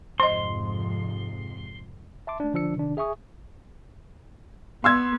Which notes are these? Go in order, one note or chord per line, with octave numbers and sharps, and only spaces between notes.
F2 G#2 C3 C5 D#5 C6
E5 A5 C6 D6
A3 D4
D3 F3 D4 E6 C#7
C3 D#3 D4
G#4 E5 G#5 C#6 D#6
B3 C6 E6 G#6